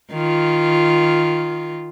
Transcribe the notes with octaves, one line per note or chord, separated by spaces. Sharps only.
D#3 F4